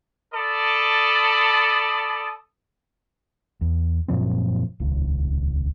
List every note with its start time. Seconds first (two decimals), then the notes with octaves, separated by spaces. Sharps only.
0.34 A4 D5 A5 B5 D#6
3.61 E2
4.08 F#2 A#2 F3 C4
4.80 D#1 C#2